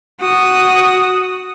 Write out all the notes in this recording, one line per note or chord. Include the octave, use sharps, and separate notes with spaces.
F#4 D#6